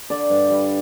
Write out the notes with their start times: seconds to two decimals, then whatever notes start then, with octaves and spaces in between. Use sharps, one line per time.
0.10 D3 D5
0.30 G2
0.50 G3